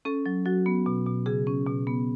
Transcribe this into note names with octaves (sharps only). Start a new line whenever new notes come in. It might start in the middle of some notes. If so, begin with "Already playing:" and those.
C#4 A4
F#3
F#3 F#4
B3
B2
B2
C#3 G#4
C#4
B2
B3